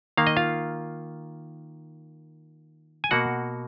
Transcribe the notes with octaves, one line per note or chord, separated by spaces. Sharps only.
D#3 A#3 F5
D#5
F4 F5
G#5
B2 A#3 F#4 F#5